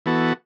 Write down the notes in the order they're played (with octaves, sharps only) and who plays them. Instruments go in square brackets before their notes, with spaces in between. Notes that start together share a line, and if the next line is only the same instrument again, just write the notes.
[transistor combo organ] E3 B3 F#4 A4